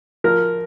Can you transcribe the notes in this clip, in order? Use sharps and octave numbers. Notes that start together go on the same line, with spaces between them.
F3 A#4